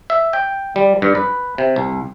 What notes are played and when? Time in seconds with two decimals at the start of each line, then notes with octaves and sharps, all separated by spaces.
0.10 E5
0.33 G5
0.76 G3
1.02 G2
1.15 B4
1.58 C3
1.76 C2